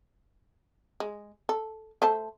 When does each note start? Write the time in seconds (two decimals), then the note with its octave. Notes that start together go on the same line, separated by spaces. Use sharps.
1.00 G#3
1.49 A4
2.02 A3 C5 A5